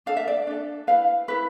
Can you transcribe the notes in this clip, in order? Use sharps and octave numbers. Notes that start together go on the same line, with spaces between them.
D4 A4 F5
E5
D5
D4 A4
E4 B4 F5
E4 B4